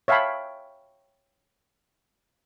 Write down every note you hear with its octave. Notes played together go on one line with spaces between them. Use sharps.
C#5 E5 F5 G5 A5 B5